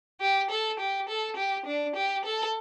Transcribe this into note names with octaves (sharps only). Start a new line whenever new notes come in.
G4
A4
G4
A4
G4
D4
G4
A4